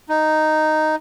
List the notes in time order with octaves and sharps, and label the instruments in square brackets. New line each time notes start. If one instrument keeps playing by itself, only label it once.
[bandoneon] D#4